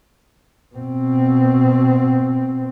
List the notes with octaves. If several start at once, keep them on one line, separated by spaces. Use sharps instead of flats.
B2 C4